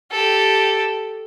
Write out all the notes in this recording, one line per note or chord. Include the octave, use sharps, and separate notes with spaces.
G4 A4